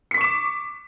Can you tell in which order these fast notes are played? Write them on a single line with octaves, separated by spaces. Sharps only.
C#7 B6 C#6 E7 D6